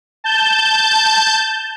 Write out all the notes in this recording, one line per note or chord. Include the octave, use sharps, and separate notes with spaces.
A5 G6